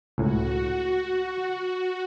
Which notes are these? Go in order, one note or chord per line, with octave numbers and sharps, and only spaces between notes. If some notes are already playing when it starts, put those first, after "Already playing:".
C#2 A2 F#4